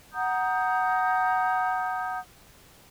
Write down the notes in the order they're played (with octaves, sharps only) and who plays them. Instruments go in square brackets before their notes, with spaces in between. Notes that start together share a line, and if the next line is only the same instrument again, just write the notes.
[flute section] F#5 A#5 D#6 G6